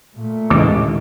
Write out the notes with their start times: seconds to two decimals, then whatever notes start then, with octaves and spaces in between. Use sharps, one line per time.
0.16 A#2 A3
0.50 A1 D#2 D3 G#3 D6